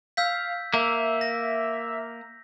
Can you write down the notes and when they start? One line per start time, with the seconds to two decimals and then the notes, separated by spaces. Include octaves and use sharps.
0.17 F5 E6 G6 B6
0.74 A#3 E5
1.21 A#6